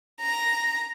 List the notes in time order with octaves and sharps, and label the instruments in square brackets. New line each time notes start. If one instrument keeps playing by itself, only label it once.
[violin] A#5